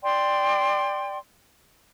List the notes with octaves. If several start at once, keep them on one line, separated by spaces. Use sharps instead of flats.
D5 G5 C6